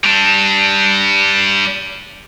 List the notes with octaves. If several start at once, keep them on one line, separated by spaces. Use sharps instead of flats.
G3 D4